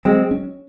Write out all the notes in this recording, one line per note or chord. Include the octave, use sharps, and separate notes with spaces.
F#3 G#3 C4
C#4